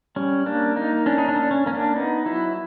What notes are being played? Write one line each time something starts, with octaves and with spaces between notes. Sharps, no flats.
G3 C#4
A#3 D4
A#3 D#4
C#4 D4
D#4
D4
C#4
C#4
A#3 C#4
D4
B3 D#4
F#3 E4